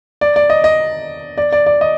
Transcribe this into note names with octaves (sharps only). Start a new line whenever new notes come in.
D5
D5
D#5
D#5
D5
D5
D5
D#5